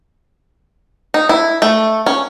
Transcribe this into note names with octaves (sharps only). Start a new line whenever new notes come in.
D#4
E4
A3
C#4